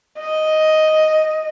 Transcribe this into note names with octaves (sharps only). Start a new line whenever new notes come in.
D#5